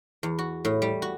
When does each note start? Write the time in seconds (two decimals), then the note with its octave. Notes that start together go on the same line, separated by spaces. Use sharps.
0.23 E2
0.39 F#4
0.65 A2
0.82 G3
1.02 F#4